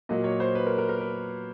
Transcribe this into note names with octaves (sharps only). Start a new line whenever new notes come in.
A#2 F#3 A#3 D#5
C#5
C5
B4
A#4
A#4
A#4
B4